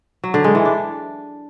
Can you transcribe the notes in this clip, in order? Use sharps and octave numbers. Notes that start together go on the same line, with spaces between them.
F#3
D3
G#3
E3
D4